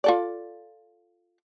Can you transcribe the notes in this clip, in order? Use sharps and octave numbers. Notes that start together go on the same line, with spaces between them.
F4 A4 D5